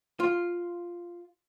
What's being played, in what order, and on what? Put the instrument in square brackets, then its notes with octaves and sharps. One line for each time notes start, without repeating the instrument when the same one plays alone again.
[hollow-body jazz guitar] F4